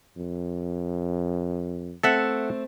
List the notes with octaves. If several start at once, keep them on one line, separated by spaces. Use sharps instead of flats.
F2
A3 C4 A4 E5 F#5